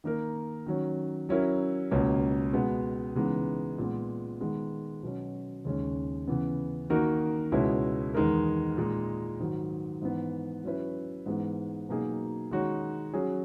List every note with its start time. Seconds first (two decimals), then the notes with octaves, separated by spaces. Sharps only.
0.04 D#3 A#3 D#4 A#4
0.66 D#3 F#3 C#4
1.29 F#3 C#4 E4 A#4
1.91 C#2 B2 A#3 C#4
2.53 B2 G#3 B3
3.15 C#3 E3 G#3 B3 D#4
3.78 A#2 G#3 B3
4.41 D#3 G#3 B3
5.03 B2 F#3 C#4
5.65 D#2 C#3 G#3 C#4
6.27 C#3 E3 B3
6.90 D#3 A#3 D#4 F#4 A#4
7.52 C#2 B2 G#3 C#4 E4
8.14 E2 D#3 G#3 D#4 A#4
8.77 A#2 G#3 D#4
9.39 G#2 D#3 F#3
10.02 G#2 E3 B3
10.64 F#3 C#4 E4 B4
11.26 G#2 E3 G#3 B3
11.89 B2 F#3 A#3 D#4 G#4
12.51 D#3 G#3 D#4 F#4 C#5
13.14 F#3 C#4 G#4